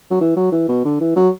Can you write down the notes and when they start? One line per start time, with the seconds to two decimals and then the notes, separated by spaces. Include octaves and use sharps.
0.10 F#3
0.21 E3
0.36 F#3
0.52 E3
0.68 B2
0.85 D3
1.00 E3
1.16 F#3